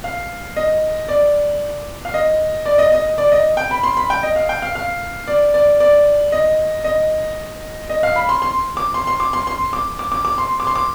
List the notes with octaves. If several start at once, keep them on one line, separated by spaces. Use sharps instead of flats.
F5
D#5
D5
F5
D#5
D5
D#5
D#5
D5
D#5
G5
B5
C6
B5
G5
D#5
F5
G5
F5
F5
D5
D5
D5
D#5
D#5
D#5
F5
B5
C6
C6
D6
C6
C6
D6
C6
C6
D6
D6
D6
D6
C6
D6
C6
D6